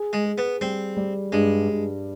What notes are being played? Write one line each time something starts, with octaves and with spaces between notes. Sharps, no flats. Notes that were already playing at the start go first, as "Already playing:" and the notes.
Already playing: G#4
G#3
G#4
B3
G3 C4
G3
G2 G#3
G2